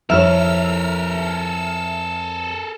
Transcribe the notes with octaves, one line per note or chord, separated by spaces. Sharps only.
F2 E4 A4 A#4 C#5 E5 F6